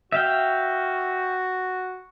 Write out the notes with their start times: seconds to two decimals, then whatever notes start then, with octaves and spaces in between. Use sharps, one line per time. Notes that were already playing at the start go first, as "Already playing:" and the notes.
0.12 F#4 E5 F5 G5